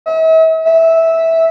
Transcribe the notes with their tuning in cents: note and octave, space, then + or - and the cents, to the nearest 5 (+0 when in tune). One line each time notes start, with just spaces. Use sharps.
E5 -45
E5 -10